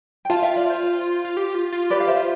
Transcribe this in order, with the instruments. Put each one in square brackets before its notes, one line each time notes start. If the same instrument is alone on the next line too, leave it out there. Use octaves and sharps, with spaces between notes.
[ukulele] G5
[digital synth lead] F4 [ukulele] F5 A5
[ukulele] E5 G5
D5 F5
C5 E5
C5
[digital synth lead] F4
G4
F4
F4
[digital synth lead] G4 [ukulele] B4 D5
[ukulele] F5
C5 E5
[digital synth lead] F4